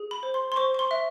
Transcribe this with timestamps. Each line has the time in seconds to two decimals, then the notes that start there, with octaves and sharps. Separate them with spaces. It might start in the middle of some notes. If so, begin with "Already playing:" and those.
Already playing: G#4
0.11 B5
0.23 C5
0.34 C6
0.52 C6
0.56 C5 C#6
0.74 C#6
0.79 C6
0.91 E5